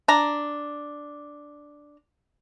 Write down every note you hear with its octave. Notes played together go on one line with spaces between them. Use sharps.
D4 A#5